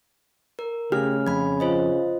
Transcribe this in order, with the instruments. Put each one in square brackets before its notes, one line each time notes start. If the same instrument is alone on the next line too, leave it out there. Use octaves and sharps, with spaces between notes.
[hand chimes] A#4
[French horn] C#3 [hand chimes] A3 F6 [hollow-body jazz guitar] G4 G#4
[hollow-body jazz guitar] F2 [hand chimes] B5 G#6
[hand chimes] F4 C5 D#5